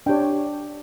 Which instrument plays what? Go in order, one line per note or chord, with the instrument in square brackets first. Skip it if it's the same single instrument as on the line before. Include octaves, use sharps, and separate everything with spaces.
[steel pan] D4 G4 C#5 G5